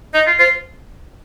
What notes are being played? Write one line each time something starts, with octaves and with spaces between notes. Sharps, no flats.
D#4 D#5
F4
F4 C5